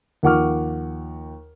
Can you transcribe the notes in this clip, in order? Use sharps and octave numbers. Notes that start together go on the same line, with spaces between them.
D#2 F3 F#5 C#6 D6 F6